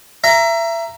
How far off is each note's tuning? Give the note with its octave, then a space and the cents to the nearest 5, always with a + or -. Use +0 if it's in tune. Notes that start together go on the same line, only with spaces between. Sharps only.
E5 +30 A#5 +0